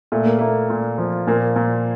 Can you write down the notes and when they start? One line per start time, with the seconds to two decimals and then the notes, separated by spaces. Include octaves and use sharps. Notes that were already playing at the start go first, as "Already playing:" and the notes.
0.12 A#2 A3
0.25 A#3
0.39 A3 A#3
0.70 A#2
0.98 F3
1.27 A#2 A#3
1.56 A#2